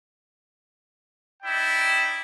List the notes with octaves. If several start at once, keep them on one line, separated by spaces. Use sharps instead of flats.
D#4 E4 D5 G5